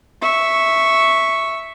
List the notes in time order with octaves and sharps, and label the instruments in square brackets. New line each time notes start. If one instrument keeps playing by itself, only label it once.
[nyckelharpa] E5 C#6